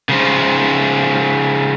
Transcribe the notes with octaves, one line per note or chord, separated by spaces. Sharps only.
C#3 F3